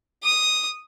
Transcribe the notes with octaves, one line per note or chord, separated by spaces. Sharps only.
D#6